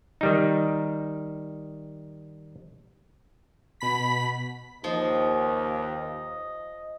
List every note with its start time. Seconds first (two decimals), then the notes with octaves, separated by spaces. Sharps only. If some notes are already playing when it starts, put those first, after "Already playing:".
0.21 D#3 G3 D#4
3.80 B2 B5 B6
4.84 D#2 F3 D#5